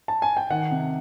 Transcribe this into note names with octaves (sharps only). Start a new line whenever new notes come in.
A5
G#5
G5
D#3 F#5
C3